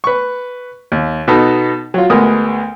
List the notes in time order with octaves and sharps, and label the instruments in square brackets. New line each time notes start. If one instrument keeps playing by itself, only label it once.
[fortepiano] B4 C#6
D#2
B2 B3 D#4 A4
F#3 F4
D2 G#3 B3 A#4 F#5 D#6